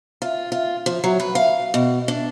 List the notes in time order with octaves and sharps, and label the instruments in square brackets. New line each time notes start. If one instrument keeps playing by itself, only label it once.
[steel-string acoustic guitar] F4
F4
F3
F#3
B4
F5
B2
D4